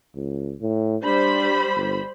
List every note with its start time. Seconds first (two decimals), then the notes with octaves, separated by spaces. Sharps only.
0.15 C#2
0.61 A2
1.04 G3 D4 C5 B5
1.76 G1